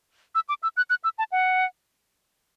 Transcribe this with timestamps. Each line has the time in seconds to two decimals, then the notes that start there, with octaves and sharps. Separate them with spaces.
0.35 E6
0.49 D6
0.63 E6
0.77 F#6
0.90 F#6
1.04 E6
1.19 A5
1.32 F#5